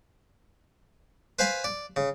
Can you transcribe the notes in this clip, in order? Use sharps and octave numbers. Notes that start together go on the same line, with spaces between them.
B4 C5 F5 G#5 B5
D5
C#3